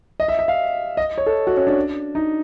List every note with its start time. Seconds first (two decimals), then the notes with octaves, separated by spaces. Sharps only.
0.20 D#5
0.28 E5
0.39 E5
0.48 F5
0.97 D#5
1.18 C#5
1.26 A4
1.47 F#4
1.57 C#4
1.67 D4
2.15 D#4